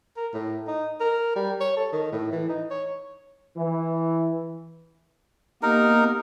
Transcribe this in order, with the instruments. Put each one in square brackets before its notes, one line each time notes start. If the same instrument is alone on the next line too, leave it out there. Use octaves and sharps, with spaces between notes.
[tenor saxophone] A#4
A2
D#4
A#4
G3
C#5
A4
D#3
A2
E3
D#4
C#5
[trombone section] E3
[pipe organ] A#3 B3 G4 [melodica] D#4 A#4